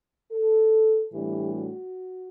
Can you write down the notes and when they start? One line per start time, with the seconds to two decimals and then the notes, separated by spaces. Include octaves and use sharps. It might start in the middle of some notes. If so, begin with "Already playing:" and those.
0.32 A4
1.12 A2 E3 G3 B3 D4 G4
1.52 F#4